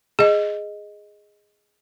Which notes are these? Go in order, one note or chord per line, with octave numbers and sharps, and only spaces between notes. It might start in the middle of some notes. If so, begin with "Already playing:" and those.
G#4 D#5